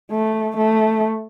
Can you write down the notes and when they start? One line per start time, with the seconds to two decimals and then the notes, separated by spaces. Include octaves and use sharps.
0.11 A3
0.57 A3